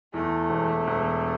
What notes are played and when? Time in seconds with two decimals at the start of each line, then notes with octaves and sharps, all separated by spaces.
0.14 E2 A3
0.50 E1
0.88 E1